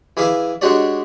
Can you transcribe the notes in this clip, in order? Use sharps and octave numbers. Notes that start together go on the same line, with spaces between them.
E3 G#4 E5 F5 D6
G#3 D4 F#4 G4 C#5 D5